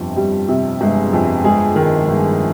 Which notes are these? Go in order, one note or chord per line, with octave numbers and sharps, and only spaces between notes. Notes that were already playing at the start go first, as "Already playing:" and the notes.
Already playing: G1 F2 C3
G3 G4
C3
G1 G#3 G#4
F2
G#3 G#4
D#3
G1